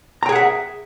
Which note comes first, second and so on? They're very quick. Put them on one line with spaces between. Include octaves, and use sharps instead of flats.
A#5 G5 G#4 F#5 E5